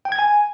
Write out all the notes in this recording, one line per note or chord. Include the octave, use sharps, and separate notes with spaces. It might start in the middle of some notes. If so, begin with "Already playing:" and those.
G5
G#6
G#5